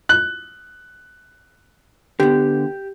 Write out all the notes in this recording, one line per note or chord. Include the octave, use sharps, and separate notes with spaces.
F#6
D3 B3 G4